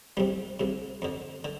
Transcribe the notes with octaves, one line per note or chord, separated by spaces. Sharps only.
C2 C3 G3
C2 C3
F2 D3
D3